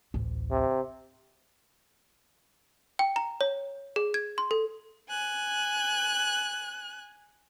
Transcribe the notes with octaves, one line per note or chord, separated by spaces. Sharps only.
A1 D2
C3
G5
A#5
C#5
G#4
G#6
C6
A4
G#5 F#6